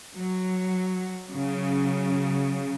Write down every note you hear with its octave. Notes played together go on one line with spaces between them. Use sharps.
F#3
C#3 F#3